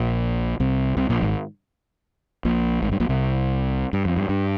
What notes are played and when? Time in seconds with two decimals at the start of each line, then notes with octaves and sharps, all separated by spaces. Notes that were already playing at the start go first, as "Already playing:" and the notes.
Already playing: A#1 A#2
0.60 C2 C3
0.97 C2 C3
1.09 A#1 A#2
1.22 G#1 G#2
2.45 A#1 A#2
2.82 G#1 G#2
2.92 G2
3.00 A#1 A#2
3.09 C2 C3
3.93 G2
4.05 F2
4.17 G2
4.29 G2